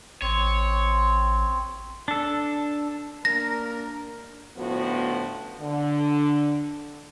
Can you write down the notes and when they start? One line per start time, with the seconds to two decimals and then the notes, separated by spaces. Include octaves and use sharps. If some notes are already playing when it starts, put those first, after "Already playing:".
0.22 A1 C4 C#5
2.08 D4 A4
3.25 A#3 D4 A#4 A#6
4.57 A2 D3 F3 B3 C#4 F#4
5.61 D3